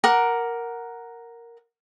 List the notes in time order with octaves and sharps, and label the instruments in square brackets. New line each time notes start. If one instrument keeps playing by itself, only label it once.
[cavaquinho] A#4 F#5 D6